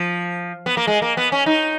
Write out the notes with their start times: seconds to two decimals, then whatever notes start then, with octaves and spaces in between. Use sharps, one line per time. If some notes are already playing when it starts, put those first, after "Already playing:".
Already playing: F3
0.66 B3
0.77 A#3
0.87 G#3
1.02 A#3
1.17 B3
1.32 C#4
1.46 D#4